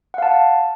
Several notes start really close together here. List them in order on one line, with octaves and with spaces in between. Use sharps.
F#5 F5 A5